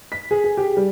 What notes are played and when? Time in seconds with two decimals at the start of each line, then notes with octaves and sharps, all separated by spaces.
0.12 B6
0.31 G#4
0.44 G#4
0.57 G4
0.77 G3